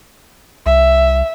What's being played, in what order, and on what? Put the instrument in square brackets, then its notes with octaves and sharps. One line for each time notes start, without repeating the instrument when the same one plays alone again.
[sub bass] C2 [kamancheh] E5